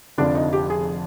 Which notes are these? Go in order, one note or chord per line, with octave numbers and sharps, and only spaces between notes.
F1 F2 D3 F3 D4
D#4
G4
G#4